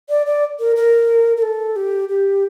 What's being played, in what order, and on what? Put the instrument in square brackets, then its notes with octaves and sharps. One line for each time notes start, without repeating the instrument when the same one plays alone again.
[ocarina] D5
D5
A#4
A#4
A#4
A4
G4
G4